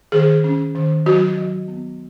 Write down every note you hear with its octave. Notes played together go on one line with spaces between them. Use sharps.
D#3 G#4
C#4
D#3
F#3 F#4
F#3
B3